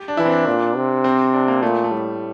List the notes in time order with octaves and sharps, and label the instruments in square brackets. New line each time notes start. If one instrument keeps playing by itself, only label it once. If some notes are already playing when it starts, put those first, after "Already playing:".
Already playing: [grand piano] G4
D4
[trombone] E3 [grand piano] E4
[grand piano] C4
D4
[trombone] A#2
C3
[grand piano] C4
D4
A#3
[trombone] A#2 [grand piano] A3
[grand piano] A3
[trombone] A2 [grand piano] G3